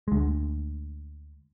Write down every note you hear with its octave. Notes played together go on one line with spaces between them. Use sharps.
D2 G#3